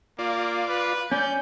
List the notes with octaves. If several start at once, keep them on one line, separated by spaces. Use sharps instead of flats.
A#3 F4 D5
B4
C#4 D5 G6